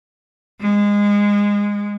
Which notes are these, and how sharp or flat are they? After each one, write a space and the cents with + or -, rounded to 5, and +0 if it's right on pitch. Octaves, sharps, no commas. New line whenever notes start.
G#3 -20